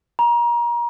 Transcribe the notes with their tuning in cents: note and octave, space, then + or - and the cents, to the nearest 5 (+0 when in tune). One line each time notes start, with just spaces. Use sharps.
A#5 +30